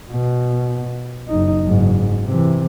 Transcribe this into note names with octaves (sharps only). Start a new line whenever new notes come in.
B2
F#1 D#4
F#1 G#2
C3 E3